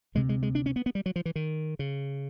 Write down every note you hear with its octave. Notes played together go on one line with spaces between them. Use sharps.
D2 C3 G#3
G#3
G#3
D4
C#4
B3
B3
G3
F#3
F3
E3
D#3
C#3